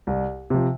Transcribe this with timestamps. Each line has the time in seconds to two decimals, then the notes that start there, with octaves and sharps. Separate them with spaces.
0.07 C2
0.50 C3 F3